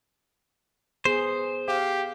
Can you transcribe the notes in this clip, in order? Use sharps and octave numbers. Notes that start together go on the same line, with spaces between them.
B3 G#4 C5
G4 F5